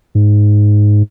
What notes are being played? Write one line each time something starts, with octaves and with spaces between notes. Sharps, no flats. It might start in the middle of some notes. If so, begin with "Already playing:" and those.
G#2